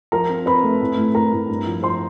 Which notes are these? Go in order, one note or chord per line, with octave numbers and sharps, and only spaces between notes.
F3 A#4 A#5
C4
C4 B4 B5
A3
A2
A2
A2 A#4 A#5
A2
G2
F3
F3 C5 C6